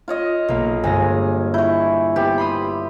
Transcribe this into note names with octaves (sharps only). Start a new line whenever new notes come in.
F4 C#5 D#5
B1 A#3
G1 G#3 G#5 A#6
E4 C#6 G6
B3 C4 G4
B5 C6 D#6